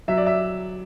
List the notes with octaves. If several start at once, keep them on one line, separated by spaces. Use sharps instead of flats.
F#3 E5
D5
E5